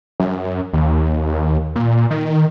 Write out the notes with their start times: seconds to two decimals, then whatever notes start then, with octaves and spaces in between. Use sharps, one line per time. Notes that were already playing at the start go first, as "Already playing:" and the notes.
0.20 F#2
0.73 D#2
1.75 A#2
2.10 D#3